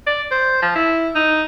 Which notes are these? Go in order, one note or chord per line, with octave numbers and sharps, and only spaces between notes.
D5
C5
F3
E4
D#4